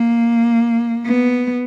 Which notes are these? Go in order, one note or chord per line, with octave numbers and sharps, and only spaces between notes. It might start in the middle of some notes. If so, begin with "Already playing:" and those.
Already playing: A#3
B3